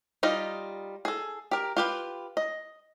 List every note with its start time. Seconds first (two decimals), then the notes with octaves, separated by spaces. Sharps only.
0.23 G3 D#4 F4 D#5
1.05 G#4 A4
1.51 G4 A#4
1.77 F4 G4 B4
2.37 D#5